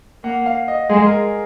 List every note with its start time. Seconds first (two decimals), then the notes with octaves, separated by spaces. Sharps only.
0.24 A#3 F#5
0.46 F5
0.68 D#5
0.89 G#3 G#4
1.06 A#4